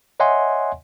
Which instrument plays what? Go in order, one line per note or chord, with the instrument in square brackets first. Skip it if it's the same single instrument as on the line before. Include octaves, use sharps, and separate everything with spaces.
[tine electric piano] C#5 D#5 E5 F#5 G#5 C6